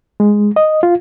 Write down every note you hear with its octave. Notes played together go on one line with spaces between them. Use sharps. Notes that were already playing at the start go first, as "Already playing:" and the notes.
G#3
D#5
F4